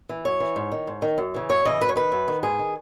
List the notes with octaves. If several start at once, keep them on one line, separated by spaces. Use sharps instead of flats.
E3
F#2 C#5
E3
G#2
D#3
G#2
D#3
F#2
C#3 E3
F#2 C#5
C#3 E3 D#5
F#2 B4
C#5
D#3 B4
F#2
D#3
G#2 G#4
D#3